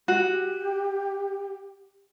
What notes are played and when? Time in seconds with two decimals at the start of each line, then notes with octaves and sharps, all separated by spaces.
0.08 F#4 G4